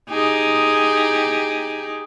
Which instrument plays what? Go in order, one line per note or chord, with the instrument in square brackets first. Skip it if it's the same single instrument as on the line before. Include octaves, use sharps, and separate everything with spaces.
[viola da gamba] D#4 G4 G#4